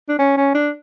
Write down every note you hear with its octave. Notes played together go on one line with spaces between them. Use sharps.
D4
C#4
C#4
D4